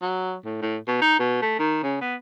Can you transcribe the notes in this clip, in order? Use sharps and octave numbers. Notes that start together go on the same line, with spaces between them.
F#3
A2
A2
B2
D#4
B2
A3
D#3
C#3
B3